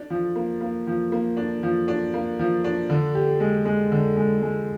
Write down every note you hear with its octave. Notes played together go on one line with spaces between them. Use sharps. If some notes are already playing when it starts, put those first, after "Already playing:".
Already playing: D4
F3
A#3
A#3
F3
A#3
D4
F3
D4
A#3
F3
D4
D3
G4
G#3
G#3
D3
G#3
G#3